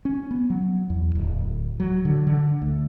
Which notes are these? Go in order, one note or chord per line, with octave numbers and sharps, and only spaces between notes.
C#4
B3
F#3
E2
D1
F#3
D3
D3
D2